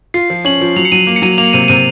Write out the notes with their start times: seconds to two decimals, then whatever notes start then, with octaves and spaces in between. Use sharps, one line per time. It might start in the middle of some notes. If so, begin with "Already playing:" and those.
0.14 F4 C7
0.30 F3
0.45 C#4 F#7
0.61 F3
0.76 F#3 F7
0.85 C#7
0.92 F#3 D#7
1.07 A#3
1.16 C#7
1.22 F#3 D#7
1.38 A#3 F7
1.53 C3 D#7
1.68 C3 D#7